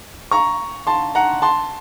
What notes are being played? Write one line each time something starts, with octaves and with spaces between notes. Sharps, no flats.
A#5 C#6
A5 C6
F#5 A#5
A5 C6